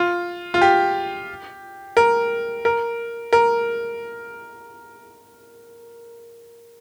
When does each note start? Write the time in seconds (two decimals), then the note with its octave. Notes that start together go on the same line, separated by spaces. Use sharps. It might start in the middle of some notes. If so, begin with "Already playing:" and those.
Already playing: F4
0.54 F4
0.61 G4
1.97 A#4
2.65 A#4
3.33 A#4